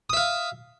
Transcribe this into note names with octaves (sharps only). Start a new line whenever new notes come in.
E5 F5 D#6